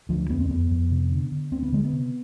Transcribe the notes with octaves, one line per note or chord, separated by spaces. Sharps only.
D2 F3
F2 B3
C4
F2 B3
F2
C3
D3
D3
D2 C4
B3
D3 G#3
B3
C3